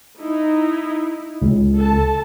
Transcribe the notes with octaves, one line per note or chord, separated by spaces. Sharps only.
D#4 E4
C#2
A4 A5